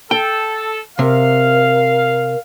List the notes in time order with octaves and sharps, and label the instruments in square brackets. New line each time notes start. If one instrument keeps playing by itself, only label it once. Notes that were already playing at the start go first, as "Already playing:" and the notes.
[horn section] A4 [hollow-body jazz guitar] G5
[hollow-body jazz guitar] C3 [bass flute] A#4 [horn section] F5